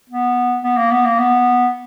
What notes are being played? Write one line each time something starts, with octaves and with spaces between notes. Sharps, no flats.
B3
B3
A#3
B3
A#3
B3